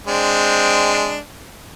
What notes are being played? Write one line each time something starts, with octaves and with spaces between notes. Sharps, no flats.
G#3 C4 D4